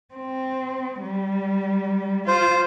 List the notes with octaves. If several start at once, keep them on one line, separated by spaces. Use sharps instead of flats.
C4
G3
F4 C5